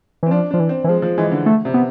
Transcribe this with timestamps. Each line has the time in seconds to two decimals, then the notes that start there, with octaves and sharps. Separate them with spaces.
0.23 E3 C4
0.31 F3 D4
0.51 F3 D4
0.60 E3
0.69 C4
0.84 E3
0.88 F3 G#3
1.02 F3
1.18 E3 G#3
1.32 D3
1.46 A3
1.65 C3
1.74 B3